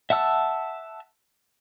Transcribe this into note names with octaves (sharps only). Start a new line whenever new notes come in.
E5 F#5 A5 E6